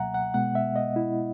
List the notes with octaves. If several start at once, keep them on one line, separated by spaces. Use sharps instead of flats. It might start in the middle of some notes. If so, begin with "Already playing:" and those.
Already playing: C#2 B2 F#3 A#3 E5 F#5 G#5 A#5
F#5
B2 G#3 B3 F#5
E5
D#5
E4